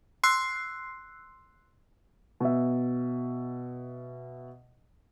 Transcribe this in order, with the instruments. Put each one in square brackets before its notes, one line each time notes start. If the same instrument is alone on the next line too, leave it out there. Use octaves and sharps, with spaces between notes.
[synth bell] C6 E6 F#6 C7
[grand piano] B2 E5